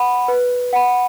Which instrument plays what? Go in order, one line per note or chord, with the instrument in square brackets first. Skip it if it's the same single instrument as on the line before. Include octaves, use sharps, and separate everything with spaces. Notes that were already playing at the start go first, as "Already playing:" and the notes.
Already playing: [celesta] F#5 B5
B4
F#5 B5